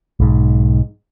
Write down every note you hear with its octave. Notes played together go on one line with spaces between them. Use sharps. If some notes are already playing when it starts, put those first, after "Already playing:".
B1 G#2